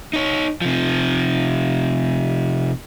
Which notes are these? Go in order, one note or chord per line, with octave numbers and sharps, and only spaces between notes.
D#4 C#5
C3 F3